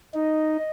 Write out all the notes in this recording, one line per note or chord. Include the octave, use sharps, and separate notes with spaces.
D#4 D#5